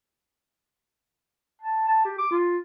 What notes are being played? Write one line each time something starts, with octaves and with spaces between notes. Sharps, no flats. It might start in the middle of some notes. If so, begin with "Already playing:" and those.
A5
A5
G4
D6
F4